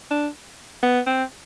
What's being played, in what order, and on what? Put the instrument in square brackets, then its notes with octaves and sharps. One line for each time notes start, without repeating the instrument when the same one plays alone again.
[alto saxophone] D4
B3
C4